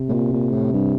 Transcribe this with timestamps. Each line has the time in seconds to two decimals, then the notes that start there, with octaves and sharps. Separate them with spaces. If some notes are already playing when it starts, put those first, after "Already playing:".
Already playing: C3
0.09 A2
0.13 A#2
0.33 A#2
0.52 A2
0.73 G2